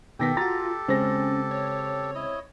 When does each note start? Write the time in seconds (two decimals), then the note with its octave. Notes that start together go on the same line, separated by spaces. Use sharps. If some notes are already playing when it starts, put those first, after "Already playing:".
0.19 B2 D#3 B3 G4 A4 G5 A#6 B6
0.37 F4 F#4 A#5 A6
0.88 C#3 G#3 C4 C#4 C5 A#6
1.51 C#5
2.15 E4 D#5